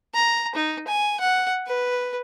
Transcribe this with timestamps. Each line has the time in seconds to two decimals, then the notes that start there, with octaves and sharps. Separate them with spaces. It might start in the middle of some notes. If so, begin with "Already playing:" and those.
0.14 A#5
0.55 D#4
0.87 G#5
1.20 F#5
1.67 B4